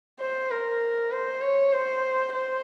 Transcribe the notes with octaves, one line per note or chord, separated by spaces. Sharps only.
C5
A#4
C5
C#5
C5
C5